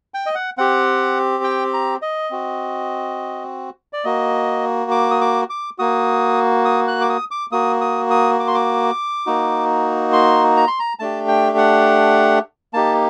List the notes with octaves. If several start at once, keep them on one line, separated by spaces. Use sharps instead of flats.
G5
D#5
F#5
C4 G4 F#5
G5
A#5
D#5
C4 F#4
D5
A#3 F#4 D#5
D6
D#6
D6
D6
A#3 F#4 D#6
D#6
F#6
D6
D#6
D6
A#3 F#4 D#6
D#6
D#6
D6
C6
D6
A#3 D#4 F#4
C6
A#5
C6
A#5
A3 D4 G4 A5
G5
F#5
A#3 D#4 G4 A5